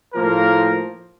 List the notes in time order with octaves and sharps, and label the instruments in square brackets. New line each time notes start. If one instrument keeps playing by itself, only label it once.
[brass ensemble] A2 F3 A#3 A#4